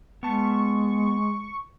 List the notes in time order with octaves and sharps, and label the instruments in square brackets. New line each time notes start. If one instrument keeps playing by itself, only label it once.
[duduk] G#3 [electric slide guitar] B3 A5 [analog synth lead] C#6